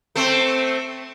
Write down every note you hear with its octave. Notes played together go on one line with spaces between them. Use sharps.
A3 C4